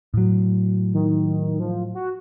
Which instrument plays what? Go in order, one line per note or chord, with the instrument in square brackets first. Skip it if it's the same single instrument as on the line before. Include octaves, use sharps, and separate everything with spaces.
[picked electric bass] A2 F#3
[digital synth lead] D#3
F3
F#4